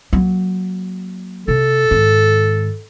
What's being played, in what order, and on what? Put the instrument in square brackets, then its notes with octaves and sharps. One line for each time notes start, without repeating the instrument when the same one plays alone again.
[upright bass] F#3 A#3
[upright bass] C3 [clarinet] A4
[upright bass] G#2 D#3